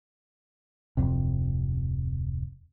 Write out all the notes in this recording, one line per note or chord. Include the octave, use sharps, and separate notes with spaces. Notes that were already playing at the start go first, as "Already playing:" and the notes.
D1 G1 F2 C3